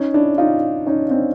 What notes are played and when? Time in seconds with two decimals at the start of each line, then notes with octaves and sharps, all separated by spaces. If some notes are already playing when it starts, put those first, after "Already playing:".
Already playing: C#4 D#4
0.14 D4 E4
0.38 D#4 F4
0.87 C#4 D#4
1.11 C4 D4